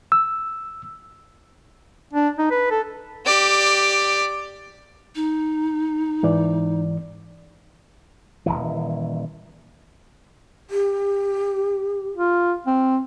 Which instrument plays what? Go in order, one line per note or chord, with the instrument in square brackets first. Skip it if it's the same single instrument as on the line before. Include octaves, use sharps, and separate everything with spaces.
[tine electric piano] E6
[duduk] D4
D#4
B4
A4
[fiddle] G4 D5
[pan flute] D#4
[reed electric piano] G#2 E3 D5
[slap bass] D#1 A#1 E3
[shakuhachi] G4
[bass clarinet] F4
C4